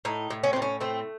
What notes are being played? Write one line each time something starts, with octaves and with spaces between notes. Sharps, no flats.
A2 D#4
A2
C#4
A2 C4
C#4
A3 C4